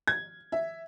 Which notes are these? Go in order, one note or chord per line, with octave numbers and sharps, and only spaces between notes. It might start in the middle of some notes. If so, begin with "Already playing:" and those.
G#6
E5